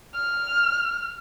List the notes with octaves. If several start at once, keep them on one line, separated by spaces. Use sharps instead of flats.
F6